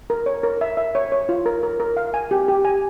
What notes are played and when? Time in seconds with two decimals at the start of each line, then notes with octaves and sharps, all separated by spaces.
0.10 A#4
0.26 C#5
0.43 A#4
0.61 E5
0.77 E5
0.95 C#5
1.12 C#5
1.29 F4
1.46 A#4
1.63 A#4
1.80 A#4
1.97 F5
2.14 G#5
2.31 G4
2.49 G4
2.65 G#5